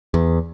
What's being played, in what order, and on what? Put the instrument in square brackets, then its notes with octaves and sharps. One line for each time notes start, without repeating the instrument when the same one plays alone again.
[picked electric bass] E2